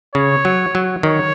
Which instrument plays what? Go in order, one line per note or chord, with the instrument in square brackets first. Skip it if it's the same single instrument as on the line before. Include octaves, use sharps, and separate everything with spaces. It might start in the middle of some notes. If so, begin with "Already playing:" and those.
[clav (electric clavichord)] C#3 [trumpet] C#5
[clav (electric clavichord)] F#3
F#3
[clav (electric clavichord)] D#3 [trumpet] C#5